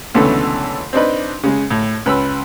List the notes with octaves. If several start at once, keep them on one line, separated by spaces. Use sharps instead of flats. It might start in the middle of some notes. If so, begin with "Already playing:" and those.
C#2 B2 D3 E3 A3
C4 D4 D#4 B4
C#3 G#3
A2
C#2 B4 B5 E6